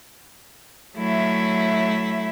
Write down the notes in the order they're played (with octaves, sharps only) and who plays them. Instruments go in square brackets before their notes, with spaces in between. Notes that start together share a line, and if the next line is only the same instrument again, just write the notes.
[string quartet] F#3 A3 E4 E5